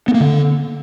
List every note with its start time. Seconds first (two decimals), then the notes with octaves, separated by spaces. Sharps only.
0.08 B3
0.14 A#3
0.21 D3